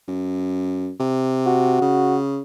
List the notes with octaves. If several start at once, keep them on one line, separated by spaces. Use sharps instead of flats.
F#2
C3
F#4
C#3